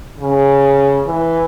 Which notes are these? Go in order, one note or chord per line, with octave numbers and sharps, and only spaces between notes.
C#3
E3